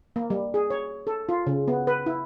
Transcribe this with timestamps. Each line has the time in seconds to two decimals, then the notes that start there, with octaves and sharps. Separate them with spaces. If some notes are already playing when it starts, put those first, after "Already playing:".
0.16 A#3
0.30 G3
0.54 G#4
0.70 C#5
1.07 A4
1.29 F4
1.47 C#3
1.68 B3
1.87 B4
2.06 E4